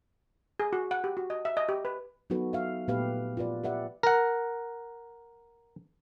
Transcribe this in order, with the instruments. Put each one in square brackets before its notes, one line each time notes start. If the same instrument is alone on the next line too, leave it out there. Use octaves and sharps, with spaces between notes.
[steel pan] G#4
F#4
F#5
G4
F#4
D#5
E5
D#5
G4
B4
[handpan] F#3 B3 D#4 F#4 A4 B4
E5 F5
A#2 A3 B3 G4 B4 F5
F4 F#4 B4 D5
G4 B4 D5 E5 F#5
[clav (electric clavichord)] A#4 F#5